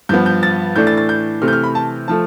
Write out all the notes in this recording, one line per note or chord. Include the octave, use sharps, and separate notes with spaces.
G2 F3 B3 G6
G6
A6
A2 E3 A3 D4 G6
A6
A6
G6
C3 E3 A3 F6
G6
F6
B5
A5
F3 A3 A5